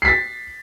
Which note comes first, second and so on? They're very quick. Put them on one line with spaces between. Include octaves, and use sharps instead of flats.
C7 B6 A6